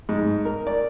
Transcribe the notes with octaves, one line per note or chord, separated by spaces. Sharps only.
G#2
A#4
D5